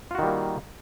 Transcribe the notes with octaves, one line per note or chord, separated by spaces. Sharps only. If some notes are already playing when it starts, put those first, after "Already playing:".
D#3 G3 A#3 F4 F#4